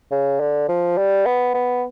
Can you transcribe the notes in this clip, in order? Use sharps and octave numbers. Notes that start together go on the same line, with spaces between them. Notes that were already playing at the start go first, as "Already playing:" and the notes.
C#3
D3
F3
G3
B3
B3